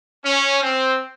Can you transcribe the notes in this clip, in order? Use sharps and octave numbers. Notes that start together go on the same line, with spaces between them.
C#4
C4